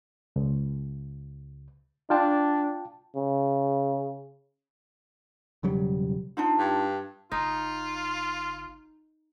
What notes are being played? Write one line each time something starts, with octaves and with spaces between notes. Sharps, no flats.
C#2
D4 F4 G5 A5
C#3
E1 C#3 F#3 G3
D4 D#4 F4
G2
F#1 D#4 F4